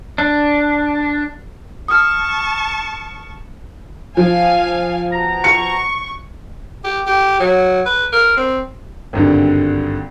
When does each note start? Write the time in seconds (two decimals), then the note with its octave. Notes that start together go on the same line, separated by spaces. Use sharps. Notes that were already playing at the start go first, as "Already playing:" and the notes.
0.18 D4
1.88 A5 C#6 D#6 F6
4.17 F3 F5 G#5
5.12 B2 A#5
5.44 C#6 C#7
6.84 G4
7.07 G4
7.40 F#3
7.86 B4
8.13 A#4
8.37 C4
9.13 G#1 G2 D3